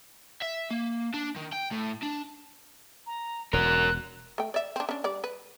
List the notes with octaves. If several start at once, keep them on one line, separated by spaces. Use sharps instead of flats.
E5
A#3
D4
D#3
G5
A2
D4
A#5
E1 F#4 A#4 F#6
A3 G5
D5 E5
C4 D4
C#4 D4
G3 D5
B4